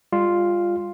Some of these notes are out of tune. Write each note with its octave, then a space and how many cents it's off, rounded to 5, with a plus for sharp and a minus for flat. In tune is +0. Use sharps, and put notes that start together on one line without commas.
G3 +35 F4 +0